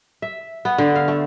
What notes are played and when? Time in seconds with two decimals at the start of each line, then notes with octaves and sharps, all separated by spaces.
0.22 E5
0.65 B3
0.78 D3
0.95 F5
1.08 A3